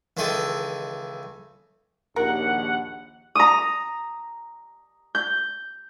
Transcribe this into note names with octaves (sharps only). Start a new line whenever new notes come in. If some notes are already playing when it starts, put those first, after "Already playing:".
C#2 D#3 E3 G#4 A4 C6
A#1 D#2 A#4 F#5
A#5 D#6
G6